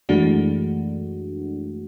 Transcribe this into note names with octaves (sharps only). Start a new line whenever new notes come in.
F#2 E3 G#3 A3 D4 F#4